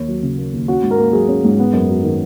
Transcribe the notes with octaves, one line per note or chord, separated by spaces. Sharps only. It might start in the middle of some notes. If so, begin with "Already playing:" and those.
Already playing: D#2 A#3 C#5
F#3
C#3
A#3
D#2
C#4 F#4
G#2
A#4
A#3
F#3 G#4
C#4
G#2
B3
F#2
F#3
D#3